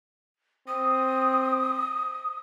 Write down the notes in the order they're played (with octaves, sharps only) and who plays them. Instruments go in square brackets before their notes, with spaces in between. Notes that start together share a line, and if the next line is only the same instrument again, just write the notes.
[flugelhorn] C4 [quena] D#6